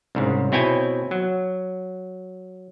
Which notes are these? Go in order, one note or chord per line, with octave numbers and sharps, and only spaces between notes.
C2 G#2 C#3
B2 C4 E4 C#5 G5 G#5
F#3